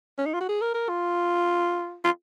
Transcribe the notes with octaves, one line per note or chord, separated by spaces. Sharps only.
C#4
D#4
F4
F#4
G#4
A#4
A#4
F4
F4